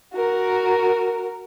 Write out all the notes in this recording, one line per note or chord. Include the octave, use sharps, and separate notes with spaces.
F#4 A#4